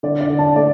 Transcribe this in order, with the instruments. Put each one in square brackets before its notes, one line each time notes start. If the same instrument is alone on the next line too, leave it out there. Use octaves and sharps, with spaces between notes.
[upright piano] D3 D5
D5
D3
A5
A3 D5